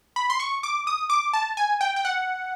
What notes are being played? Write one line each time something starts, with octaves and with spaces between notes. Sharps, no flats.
B5
C6
C#6
D6
D#6
D6
A5
G#5
G5
G5
F#5